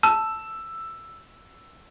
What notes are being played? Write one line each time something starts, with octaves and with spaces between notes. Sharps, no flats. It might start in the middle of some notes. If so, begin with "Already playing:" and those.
A5 E6